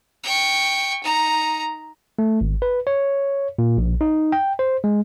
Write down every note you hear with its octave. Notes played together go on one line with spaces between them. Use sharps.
G5 C#6
D#4 A#5
A3
G#1
B4
C#5
A#2
A#1
D#4
G5
C5
G#3